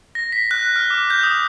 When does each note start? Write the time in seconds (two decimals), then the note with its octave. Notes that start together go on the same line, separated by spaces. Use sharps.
0.15 A#6
0.32 B6
0.51 F#6
0.76 F6
0.90 D6
1.10 G6
1.23 D#6